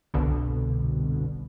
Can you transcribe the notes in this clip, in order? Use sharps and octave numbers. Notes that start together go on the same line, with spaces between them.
G1 C2 B2 D3